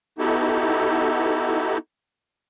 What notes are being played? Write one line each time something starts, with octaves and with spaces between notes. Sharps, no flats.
B3 D#4 E4 F#4 G4 A4